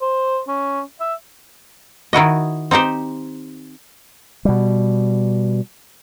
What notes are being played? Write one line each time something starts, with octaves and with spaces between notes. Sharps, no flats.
C5
C#4
E5
D#3 E4 F#4 D#5
C4 D#4 G4 C5
B2 G3